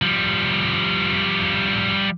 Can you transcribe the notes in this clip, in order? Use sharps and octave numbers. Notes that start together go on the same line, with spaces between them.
F3 G3